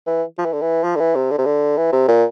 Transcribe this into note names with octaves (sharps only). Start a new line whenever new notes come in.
E3
F3
E3
D3
E3
F3
D3
E3
C3
D3
C3
D3
E3
C3
A#2